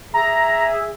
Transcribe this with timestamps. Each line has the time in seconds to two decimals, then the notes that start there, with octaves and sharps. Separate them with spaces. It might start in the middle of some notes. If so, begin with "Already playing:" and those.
0.14 G#4 E5 A#5